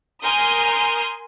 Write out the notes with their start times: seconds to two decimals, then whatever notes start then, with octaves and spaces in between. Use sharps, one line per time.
0.23 A#4 G#5 C6 D#6 F6 G6